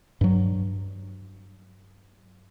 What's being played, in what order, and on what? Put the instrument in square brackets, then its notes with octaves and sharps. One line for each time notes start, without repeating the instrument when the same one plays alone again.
[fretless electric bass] G2 F#3